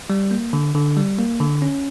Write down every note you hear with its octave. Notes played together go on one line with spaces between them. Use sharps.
G3
A#3
D3
D3
G3
A#3
D3
C#4